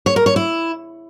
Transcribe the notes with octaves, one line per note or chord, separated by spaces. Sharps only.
C#5
A#4
C#5
E4